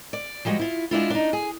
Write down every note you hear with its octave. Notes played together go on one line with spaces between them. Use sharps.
D5
F3 G3 G#3 F#4
E4 F4
G#3 D4 E4 F4
D4 D#4
G#4